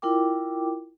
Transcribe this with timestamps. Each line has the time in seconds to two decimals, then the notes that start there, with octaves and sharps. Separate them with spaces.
0.02 E4 F4 A#4 G5 D6